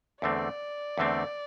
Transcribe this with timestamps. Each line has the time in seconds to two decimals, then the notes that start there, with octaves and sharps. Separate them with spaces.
0.22 E2 D3 A3 C4 D5
0.98 E2 D3 A3 C4